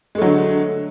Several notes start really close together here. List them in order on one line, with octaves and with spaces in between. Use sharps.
G#3 A3 F#3 D3